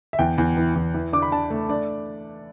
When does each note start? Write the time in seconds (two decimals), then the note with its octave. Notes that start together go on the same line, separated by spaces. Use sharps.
0.13 E5
0.19 E2 G5
0.38 E2
0.57 E3
0.75 E2
0.94 E3
1.13 D4 D6
1.22 B5
1.32 D4 A5
1.50 A3
1.69 D4 D5